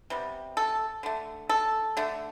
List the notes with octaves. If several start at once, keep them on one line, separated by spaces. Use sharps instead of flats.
C3 G3 B3
A4
D3 A3
A4
D3 A3